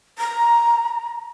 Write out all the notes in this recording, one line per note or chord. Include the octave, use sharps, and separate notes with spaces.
A#5